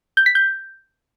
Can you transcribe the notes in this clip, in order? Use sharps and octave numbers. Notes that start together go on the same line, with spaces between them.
G6
B6
G6